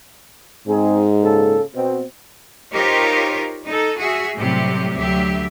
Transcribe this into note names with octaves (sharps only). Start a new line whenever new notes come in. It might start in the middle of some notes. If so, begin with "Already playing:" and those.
G#2 C4 D#4 G#4
A#2 C#3 A4
B2 C4
D#4 F4 G4 A#4 C5 C#5
D#4 A4
F#4 G#4 E5
A2 C3 F#3 G3 G4
D2 F#3 G4 E5